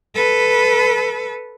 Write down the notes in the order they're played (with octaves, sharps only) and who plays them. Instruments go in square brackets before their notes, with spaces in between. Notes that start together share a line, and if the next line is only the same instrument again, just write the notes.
[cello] A4 B4